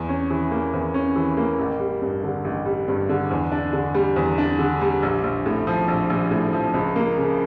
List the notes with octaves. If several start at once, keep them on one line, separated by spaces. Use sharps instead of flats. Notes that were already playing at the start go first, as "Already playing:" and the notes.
Already playing: E2
C#4
E3
A#3
E2
C#4
E3
A#3
A1
G3
G2
D3
A1
G3
G2
D3
E2
D4
D3
G3
E2
D4
D3
G3
A#1
A#1
A2
F3
A#1
A#1
A2
F3
C#2
A#3
C#3